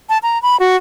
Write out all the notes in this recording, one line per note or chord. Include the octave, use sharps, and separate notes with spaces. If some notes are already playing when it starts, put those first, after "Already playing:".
A5
A#5
B5
F#4